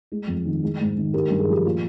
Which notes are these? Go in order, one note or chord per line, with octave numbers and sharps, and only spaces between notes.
G#3
F2
D#3
G#3
G#2
D#3
G#3 G4 A#4
G2
G#4
F3 G4
A#2 F4